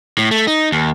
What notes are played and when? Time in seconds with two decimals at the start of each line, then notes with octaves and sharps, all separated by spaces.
0.18 A2
0.31 A3
0.47 D#4
0.72 D#2